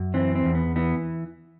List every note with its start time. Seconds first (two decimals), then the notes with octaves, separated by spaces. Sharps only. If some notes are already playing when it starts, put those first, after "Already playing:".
Already playing: F#2
0.14 E3 C4
0.35 C4
0.45 E2
0.55 B3
0.76 E3 B3